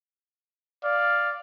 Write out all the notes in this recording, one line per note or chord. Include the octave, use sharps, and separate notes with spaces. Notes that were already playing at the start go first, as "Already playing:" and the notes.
D5 F5